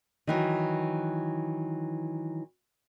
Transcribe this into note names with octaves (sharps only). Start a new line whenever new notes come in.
D#3 E3 F#3